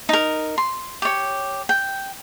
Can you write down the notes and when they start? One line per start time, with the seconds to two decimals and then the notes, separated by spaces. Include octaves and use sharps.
0.09 D#4 A#4
0.58 C6
1.02 G4 C#5
1.69 G5